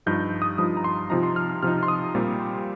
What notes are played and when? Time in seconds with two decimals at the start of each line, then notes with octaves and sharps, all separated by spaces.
0.06 G2 F3 D#4 G6
0.42 D#6
0.58 G2 F3 D#4 D#6
0.77 A#5
0.84 C6
1.10 C3 F3 D#4 A#5
1.23 C6
1.36 F6
1.49 F6
1.63 C3 F3 D#4 F6
1.83 C6
1.88 D#6
2.15 A#2 G3 C4 F4